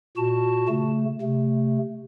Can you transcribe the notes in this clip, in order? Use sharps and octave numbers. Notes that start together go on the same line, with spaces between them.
A#2 F#4 A5
C#3 A3
C3 A3